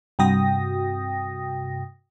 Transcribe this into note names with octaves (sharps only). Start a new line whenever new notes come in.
G2 C3 F#4 G5 D#6 A#6